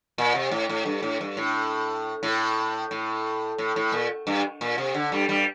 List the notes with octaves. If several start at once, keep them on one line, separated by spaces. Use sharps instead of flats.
A#2
C3
A2
A2
G2
A2
G2
A2
A2
A2
A2
A2
A#2
G2
A#2
C3
D3
G2 G3
G2 G3